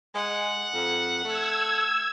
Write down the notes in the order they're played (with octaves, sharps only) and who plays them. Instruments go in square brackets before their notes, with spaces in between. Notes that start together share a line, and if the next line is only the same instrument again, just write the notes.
[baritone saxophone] G#3 [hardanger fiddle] F#5
[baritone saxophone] F2
[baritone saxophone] A3 [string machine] E6 G#6